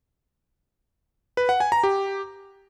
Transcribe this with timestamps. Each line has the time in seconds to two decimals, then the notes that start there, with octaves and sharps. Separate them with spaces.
1.37 B4
1.49 F#5
1.60 G#5
1.72 A#5
1.83 G4